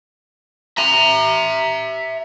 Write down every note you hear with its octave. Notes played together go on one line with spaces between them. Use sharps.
E5 A#5